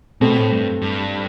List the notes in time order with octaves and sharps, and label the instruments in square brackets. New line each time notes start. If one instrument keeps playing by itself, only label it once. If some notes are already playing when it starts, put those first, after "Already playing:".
[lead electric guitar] B2 [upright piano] A3 C4
[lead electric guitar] A2
G2
G2